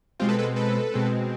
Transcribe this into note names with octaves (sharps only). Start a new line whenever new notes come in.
B2 G#3 C4 F4 G4
A4 B4
A4 B4
A4 B4
B2 G#3 C4